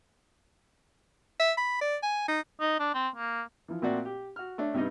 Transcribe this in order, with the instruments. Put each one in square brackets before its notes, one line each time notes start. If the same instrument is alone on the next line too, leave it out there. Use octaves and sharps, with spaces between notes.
[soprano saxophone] E5
B5
D5
G#5
D#4
[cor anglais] D#4
D4
C4
A#3
[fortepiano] E3 F3
A#2 A3 C4 F#4 D5
G4
F#4 F6
A3 D4 C#5
G2 C3 G3 B3 D#4 D#5